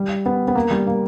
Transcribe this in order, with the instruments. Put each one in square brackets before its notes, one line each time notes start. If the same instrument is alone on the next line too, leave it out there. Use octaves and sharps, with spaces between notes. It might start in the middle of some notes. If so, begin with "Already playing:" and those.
Already playing: [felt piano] G3
B3
B3
A#3
G3
A#3